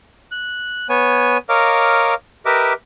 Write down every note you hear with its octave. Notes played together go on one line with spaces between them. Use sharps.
F#6
B3 C#5 G#5
A#4 C#5 D#5 F5 D6
G4 A#4 B4 D#5 E5 D6